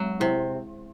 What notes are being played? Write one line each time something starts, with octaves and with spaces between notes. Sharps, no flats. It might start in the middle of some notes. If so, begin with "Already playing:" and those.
Already playing: F#3 G#3
C3 E4